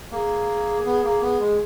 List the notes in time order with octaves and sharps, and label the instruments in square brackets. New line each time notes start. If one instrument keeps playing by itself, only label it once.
[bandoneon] A#3 [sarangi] G#4
[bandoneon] B3
A#3
B3
G#3